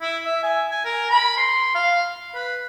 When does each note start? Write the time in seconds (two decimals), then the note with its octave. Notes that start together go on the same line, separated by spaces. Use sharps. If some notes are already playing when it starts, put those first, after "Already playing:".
0.01 E4
0.25 E5
0.43 G#5
0.71 G#5
0.85 A#4
1.10 B5
1.37 C6
1.75 F5
2.35 B4